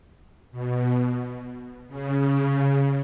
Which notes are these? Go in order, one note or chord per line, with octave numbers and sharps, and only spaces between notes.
B2
C#3